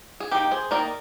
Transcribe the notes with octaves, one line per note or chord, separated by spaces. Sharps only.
G#4
D#3 A#3 D#4 G4
G#4 C5
D#3 A#3 D#4 A#4 D5